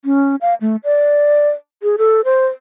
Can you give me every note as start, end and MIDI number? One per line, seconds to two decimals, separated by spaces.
0.05 0.36 61
0.41 0.54 77
0.61 0.76 57
0.84 1.49 74
1.83 1.96 68
1.98 2.21 69
2.25 2.47 72